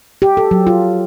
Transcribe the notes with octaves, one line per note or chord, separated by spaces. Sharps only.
G4
A4
F#3
F4